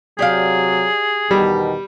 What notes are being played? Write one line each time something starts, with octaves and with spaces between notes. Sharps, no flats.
C3 F#3 G4 G#4 D5 F5
E2 B2 D#3 G3